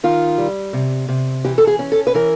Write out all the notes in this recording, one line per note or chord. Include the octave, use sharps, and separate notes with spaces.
D#3 F4
G3
C3
C3
E3 G4
A4
G#4
C#4
A4
B4
E3 A#4